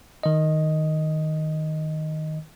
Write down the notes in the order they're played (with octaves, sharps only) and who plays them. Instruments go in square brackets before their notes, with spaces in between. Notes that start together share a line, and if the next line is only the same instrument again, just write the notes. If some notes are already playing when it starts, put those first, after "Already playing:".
[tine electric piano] D#3 D#5